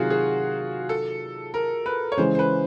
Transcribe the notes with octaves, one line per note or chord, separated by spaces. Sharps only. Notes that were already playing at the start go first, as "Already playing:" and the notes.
Already playing: C3 D#3 F#3 F4 F#4 G#4
G#4
A4
A#4
B4
C#5
C#3 E3 G#3 C5
C5
B4